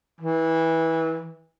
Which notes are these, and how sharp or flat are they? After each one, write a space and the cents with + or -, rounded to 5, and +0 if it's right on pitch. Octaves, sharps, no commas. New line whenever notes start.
E3 -20